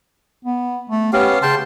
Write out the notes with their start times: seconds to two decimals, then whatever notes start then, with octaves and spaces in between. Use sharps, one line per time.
0.45 B3
0.90 A3
1.13 B3 C#4 G4 F5
1.42 C#3 G5 A5 C6